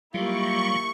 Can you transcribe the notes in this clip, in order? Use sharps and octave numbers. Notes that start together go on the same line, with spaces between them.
F#3 G3 A#3 E4 F4 G4 C#6